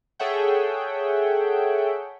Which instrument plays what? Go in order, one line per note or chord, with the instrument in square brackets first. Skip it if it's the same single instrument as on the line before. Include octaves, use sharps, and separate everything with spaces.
[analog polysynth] G#4 A4 C#5 E5 F#5 G5